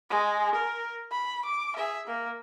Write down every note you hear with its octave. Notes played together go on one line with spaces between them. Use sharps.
G#3
A#4
B5
D6
G#4 E5
A#3